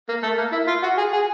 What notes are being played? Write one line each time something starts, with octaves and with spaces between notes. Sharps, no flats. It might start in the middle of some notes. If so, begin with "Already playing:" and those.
A#3
A3
A#3
E4
F4
F#4
G#4
G#4